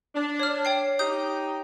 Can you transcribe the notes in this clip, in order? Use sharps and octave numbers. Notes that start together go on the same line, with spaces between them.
D4
C#5 F6
C#5 G5 C7
D#4 G4 D#6 G6